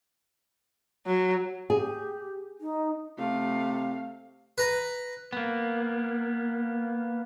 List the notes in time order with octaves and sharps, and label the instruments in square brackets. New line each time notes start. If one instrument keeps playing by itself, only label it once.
[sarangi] F#3
[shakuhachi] G4 [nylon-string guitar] G#4
[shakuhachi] D#4
[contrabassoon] C3 [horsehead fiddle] A3 F5
[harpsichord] B4 A#5
[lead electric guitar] A#3 B3